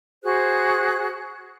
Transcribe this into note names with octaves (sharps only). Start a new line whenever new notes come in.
F#4 G#4 C5 F#6